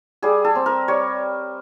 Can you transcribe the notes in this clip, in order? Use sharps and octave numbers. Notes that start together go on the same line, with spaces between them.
G3 G#4
A4
C4
A#4
G3 C#5